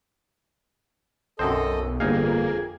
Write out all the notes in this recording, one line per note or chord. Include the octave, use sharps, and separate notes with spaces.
B1 F#2 C4 A4 C5 D#5
G1 F2 A#3 D#4 G#4 F5